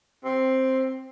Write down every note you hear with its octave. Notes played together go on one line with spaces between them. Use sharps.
C4